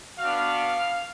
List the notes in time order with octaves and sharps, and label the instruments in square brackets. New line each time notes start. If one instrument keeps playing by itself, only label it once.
[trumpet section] B3 D4 F#4 F5